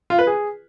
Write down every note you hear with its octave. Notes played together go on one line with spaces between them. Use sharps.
F4
B4
G#4